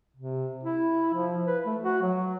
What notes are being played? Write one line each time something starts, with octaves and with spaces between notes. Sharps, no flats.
C3
E4
F3
B4
A3
F#4
F#3